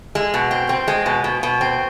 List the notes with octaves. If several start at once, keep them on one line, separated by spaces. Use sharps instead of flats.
G#3
B2
C4
C4
G#3
B2
B2
B2
C4